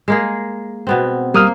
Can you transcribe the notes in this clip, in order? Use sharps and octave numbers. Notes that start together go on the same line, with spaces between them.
G#3 A#3 G#4
B2 B3 C4
G3 A#3 D#6 F6